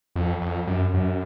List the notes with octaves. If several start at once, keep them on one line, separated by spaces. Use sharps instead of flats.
F2
F2
F#2
F#2